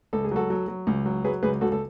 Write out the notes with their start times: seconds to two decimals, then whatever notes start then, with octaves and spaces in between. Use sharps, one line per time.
0.13 C#2 A4
0.25 G#4
0.31 F#3 F#4 A4
0.50 F#3
0.68 F#3
0.87 C#2
1.06 F#3
1.24 F#3 G#4 B4
1.43 C#2 G#4 B4
1.61 C#2 F#4 A4
1.72 A4